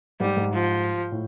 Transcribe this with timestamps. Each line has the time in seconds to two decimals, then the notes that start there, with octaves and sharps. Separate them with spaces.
0.20 G#2 G3
0.37 G#2
0.54 F3
1.12 A2